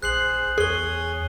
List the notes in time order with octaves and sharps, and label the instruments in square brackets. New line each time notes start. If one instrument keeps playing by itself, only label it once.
[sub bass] A#1 [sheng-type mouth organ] G#4 C5 [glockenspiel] F#6 C7 F#7
[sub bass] E2 [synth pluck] G#4 [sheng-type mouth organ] C#5 G#5 D#6 [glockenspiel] C7 G7